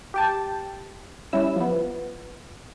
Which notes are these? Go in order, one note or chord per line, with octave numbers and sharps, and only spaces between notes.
G4 G5 A5
G3 C#4 E4 E6
F3 B3